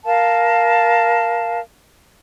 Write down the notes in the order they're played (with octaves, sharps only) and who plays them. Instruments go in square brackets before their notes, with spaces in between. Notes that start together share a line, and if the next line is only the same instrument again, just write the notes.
[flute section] A#4 F5 A5